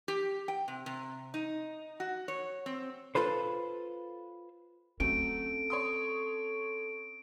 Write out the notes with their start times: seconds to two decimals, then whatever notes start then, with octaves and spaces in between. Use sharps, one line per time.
0.08 G4
0.48 G5
0.68 C3
0.86 C3
1.34 D#4
2.00 F#4
2.28 C#5
2.66 C4
3.15 F4 A4 B4 C5
5.00 F#3 A3 C4 C#4 A4 D7
5.70 C#5 C6 D#6